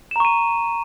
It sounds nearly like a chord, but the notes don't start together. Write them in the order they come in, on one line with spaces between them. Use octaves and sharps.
E7 A#5 C#6 D#7